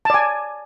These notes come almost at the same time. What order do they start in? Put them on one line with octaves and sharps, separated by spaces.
A5 D5 G#5